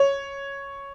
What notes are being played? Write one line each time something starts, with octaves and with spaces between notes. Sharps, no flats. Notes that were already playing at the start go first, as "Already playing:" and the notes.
Already playing: C#5